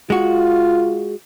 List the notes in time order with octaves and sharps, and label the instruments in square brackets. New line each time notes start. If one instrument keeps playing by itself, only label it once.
[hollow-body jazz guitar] G#3 F#4 [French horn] F4